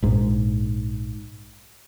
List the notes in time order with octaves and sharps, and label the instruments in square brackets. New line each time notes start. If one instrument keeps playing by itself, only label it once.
[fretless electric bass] A#1 G#2